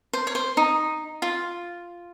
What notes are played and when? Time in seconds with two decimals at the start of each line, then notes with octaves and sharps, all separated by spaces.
0.13 C5
0.27 C#5
0.35 C5
0.57 D#4
1.22 F4